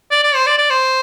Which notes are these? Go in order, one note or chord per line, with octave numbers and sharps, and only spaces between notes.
D5
D5
C5
D5
D5
C5